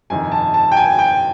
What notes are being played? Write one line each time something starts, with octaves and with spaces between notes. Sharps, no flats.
G1 F2 C3 D#3 G#5
A5
A5
G5
G#5
G5